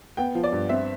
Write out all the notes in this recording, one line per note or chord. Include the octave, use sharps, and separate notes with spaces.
B3 G5
F3
D5
G2
C4 E5